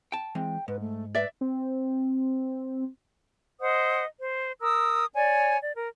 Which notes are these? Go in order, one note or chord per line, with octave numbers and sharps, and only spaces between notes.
G5 A5
E3 G#3 C4 G5
G#2 B4
A3
B4 D5 E5
C4
C5 D#5 F#5 D#6
C5
A#4 D#6 E6
C#5 D5 G#5
D5
A#4